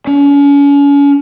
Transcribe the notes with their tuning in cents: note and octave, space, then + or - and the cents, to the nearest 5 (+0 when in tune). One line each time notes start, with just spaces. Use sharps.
C#4 +40